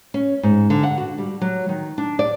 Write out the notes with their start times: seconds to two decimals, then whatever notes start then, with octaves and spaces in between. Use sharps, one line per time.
0.14 C#4
0.43 G#2
0.70 D3
0.83 F#5
0.98 F#4
1.18 G3
1.41 F#3
1.69 D#3
1.98 D4
2.19 D5